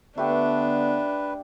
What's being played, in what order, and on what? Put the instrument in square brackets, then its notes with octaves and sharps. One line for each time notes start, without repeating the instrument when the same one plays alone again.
[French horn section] D3 B3 [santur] A3 G4 [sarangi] D4 [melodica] B4